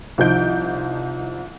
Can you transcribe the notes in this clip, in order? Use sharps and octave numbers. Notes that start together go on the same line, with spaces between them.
C2 D#3 F3 D#5 G6 D7